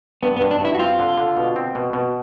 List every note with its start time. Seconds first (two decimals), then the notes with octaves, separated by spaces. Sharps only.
0.23 G2 B3
0.36 B3
0.41 G2
0.51 D4
0.60 G2 E4
0.75 F#4
0.79 C4 F4
0.99 D3
1.18 D3
1.37 B2
1.56 C4
1.75 B2
1.93 B2